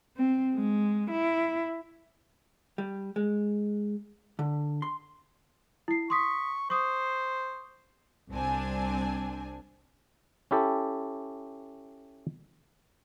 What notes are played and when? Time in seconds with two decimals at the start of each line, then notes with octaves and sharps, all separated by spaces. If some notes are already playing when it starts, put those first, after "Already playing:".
0.17 C4
0.55 G#3
1.10 E4
2.78 G3
3.16 G#3
4.39 D3
4.82 C6
5.88 E4 C7
6.10 C6 C#6 D#6 B6
6.70 C5 C#6 D#6
8.31 C2 C4 D4 G#5
10.51 C#4 E4 G4 A4